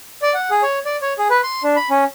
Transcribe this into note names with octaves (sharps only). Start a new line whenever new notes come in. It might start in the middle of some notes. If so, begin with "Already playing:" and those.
D5
F#5
G#4
C#5
D5
C#5
G#4
B4
C6
D4
B5
C#4